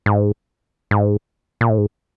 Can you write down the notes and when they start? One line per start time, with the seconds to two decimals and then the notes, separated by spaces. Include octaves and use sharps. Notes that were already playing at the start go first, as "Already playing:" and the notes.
0.06 G#2
0.91 G#2
1.61 A#2
1.70 A2
1.78 G#2